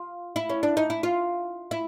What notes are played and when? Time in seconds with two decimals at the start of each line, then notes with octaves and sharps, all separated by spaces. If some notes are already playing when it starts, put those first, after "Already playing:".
Already playing: F4
0.36 E4
0.50 C#4
0.63 D4
0.77 D#4
0.90 E4
1.03 F4
1.71 E4